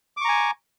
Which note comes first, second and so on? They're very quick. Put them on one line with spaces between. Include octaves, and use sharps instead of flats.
D6 C#6 A#5 G#5